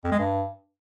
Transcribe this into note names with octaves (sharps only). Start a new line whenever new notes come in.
F2
G#3
G2